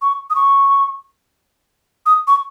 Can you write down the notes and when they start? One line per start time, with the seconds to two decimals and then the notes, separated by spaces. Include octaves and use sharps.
0.02 C#6
0.30 D#6
0.35 C#6
2.06 D#6
2.27 C#6